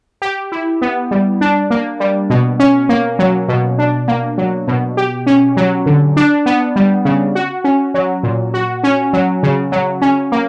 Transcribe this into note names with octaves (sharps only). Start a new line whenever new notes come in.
G4
E4
B3
G3
D4
A#3
G3
B2
C#4
A#3
F#3
B2
D4
A#3
F#3
B2
G4
C#4
F#3
D3
D4
B3
G3
C#3
F#4
C#4
F#3
A#2
F#4
C#4
F#3
C#3
F#3
C#4
A#3